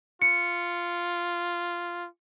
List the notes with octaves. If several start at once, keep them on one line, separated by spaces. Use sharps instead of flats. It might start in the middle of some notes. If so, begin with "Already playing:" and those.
F4 C#7